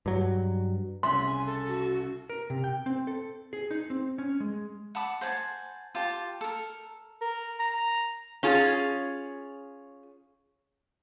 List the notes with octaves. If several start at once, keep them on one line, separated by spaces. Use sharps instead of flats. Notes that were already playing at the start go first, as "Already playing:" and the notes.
G2 F#3
C2 C#3 E5 C6
G#5
A4
F#4
A#4
C3
G5
C4
A4
G#4
D#4
C4
C#4
G#3
F#5 A5 B5 D6
C5 F#5 G#5 A5
F4 G4 A5
A4 A#4
A#4
A#5
C#4 F4 G#4